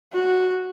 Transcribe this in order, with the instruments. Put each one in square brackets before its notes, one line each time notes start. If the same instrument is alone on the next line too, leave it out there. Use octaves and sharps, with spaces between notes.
[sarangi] F#4